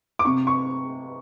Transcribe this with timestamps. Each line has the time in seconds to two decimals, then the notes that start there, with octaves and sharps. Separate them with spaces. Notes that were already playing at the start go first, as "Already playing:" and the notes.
0.19 D6
0.25 C3 C#6
0.47 C#6